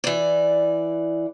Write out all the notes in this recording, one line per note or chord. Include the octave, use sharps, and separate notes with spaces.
E3 D5